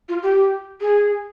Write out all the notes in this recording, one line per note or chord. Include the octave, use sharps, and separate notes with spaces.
F4
G4
G#4